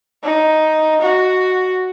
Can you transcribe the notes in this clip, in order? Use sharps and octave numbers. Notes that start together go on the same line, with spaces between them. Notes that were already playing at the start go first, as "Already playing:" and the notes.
D#4
F#4